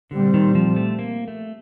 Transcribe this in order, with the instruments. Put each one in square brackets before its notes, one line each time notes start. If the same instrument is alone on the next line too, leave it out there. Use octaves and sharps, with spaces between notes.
[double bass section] A#2 G3 C4 [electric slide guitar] D3
[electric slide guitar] D#3
F3
A3
A#3
A3